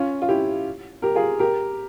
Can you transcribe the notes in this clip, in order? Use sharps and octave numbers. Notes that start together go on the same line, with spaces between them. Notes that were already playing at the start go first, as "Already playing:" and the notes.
Already playing: C#4 F4
F4
E4 G4
G4 A#4
F4 G#4
G4 A#4